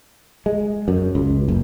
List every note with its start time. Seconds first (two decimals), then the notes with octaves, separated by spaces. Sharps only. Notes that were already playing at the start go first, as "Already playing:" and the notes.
0.46 G#3
0.88 F#2
1.15 C#2
1.48 F#1